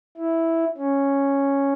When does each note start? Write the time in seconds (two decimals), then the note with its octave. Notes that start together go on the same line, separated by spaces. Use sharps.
0.17 E4
0.78 C#4